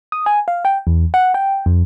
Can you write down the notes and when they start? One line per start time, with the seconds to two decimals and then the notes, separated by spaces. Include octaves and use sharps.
0.12 D#6
0.26 G#5
0.48 F5
0.65 G5
0.87 E2
1.14 F#5
1.34 G5
1.66 F2